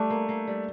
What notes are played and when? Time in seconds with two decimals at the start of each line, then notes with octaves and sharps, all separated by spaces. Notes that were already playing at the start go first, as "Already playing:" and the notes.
Already playing: G3 A3 D4 G4
0.10 A#3
0.29 A#3
0.47 G3